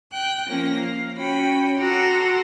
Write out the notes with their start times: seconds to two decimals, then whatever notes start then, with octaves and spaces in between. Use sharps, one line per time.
0.13 G5 F#6
0.48 F3 A#3 C#4 A#6
0.78 F5
1.17 C#4 F#4 C#5 G5 B5
1.79 F#4 A4 F#5 A#5 C6 D6